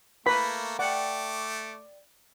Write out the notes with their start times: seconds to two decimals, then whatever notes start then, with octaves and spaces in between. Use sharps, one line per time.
0.26 A3 A#3 B4 B5
0.79 A3 D5 F#5 G5 D6